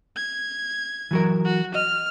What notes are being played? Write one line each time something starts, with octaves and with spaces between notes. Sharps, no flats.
G#6
E3 F#3 A#4
F#4
D#5 F6